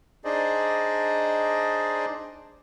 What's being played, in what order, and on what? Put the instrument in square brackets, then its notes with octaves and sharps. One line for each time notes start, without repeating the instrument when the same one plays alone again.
[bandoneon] D4 D#4 G#4 C5 D5 D#5